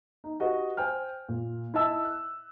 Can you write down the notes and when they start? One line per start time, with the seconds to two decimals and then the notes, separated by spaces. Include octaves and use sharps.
0.24 D#4
0.40 F#4 G4 B4 D#5
0.77 C5 G5 G#5 F6
1.29 A#2
1.74 E4 D#5 E5 A5 E6
2.05 F#6